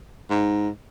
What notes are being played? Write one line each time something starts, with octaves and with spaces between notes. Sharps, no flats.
G#2